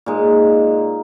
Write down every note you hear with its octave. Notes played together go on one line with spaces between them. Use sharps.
A#2 G#3 D#4